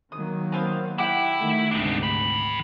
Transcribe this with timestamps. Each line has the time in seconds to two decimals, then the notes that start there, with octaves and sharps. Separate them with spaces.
0.12 D#3 F#3 A#3 D#6
0.52 B3 C4 F5
0.98 E4 G4 E5 F#5 G5
1.38 D#3 A3
1.71 D2 G#2 C3 D4 D#4
2.03 D#3 B5